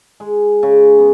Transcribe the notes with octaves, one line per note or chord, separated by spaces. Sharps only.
G#3
C#3
B3